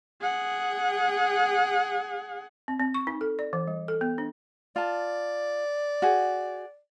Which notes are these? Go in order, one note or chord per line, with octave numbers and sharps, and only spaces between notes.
G#4 F#5
C4
C4
C#6
D#4
A4
D5
E3
G3
A4
B3
D4
F4 D5 A5
F#4 G#4